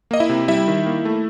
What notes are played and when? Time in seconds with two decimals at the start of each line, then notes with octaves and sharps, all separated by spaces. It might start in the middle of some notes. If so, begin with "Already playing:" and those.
0.11 A#3 D#5
0.20 E4 E5
0.29 C3
0.48 G3 E4 E5
0.68 D#3
0.86 A#3
1.05 A3